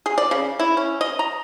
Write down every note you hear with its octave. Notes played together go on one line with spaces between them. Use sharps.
G#4
D5
C#3
E4
C#4
D#5
A#5